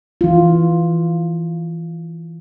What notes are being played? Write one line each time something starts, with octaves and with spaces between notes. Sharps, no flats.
E3 F4